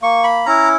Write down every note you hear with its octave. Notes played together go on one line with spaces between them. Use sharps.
A#3 C#6
B5
C#4 E4 A#5